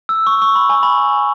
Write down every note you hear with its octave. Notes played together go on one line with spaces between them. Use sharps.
E6
C#6
C#6
B5
G#5
B5